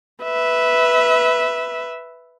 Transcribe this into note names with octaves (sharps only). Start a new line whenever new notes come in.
B4 E5